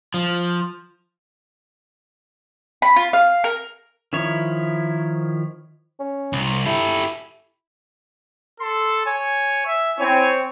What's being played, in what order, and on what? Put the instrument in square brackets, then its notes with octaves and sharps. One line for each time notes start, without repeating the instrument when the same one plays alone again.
[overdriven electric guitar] F3
[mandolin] B5
F4
F5
A#4
[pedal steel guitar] D#3 F3 E4 C#5
[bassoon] C#4
[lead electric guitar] C2
[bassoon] E4 [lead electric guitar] G4 A4
[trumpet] A4 [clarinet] C6
[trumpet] C#5 [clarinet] G#5
[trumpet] E5
[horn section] C4 C#5 [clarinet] E4 [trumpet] G#5